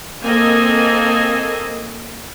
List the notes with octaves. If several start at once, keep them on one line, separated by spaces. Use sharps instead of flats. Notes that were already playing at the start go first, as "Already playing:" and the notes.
A#3 C4 A4 D#5 G#5